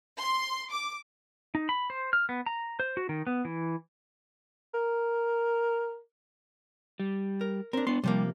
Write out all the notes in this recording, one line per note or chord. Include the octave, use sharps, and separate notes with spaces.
C6
D6
D#4
B5
C5
F6
B3
A#5
C5
F#4
D#3
B3
E3
A#4
G3
A#4
C4 D4 A#4
B3 D4 C6
C3 F3 G3 A#3